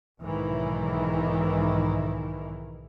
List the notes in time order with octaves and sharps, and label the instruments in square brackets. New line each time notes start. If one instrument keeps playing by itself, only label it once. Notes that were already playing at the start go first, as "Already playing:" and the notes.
[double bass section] B1 G#2 D#3 E3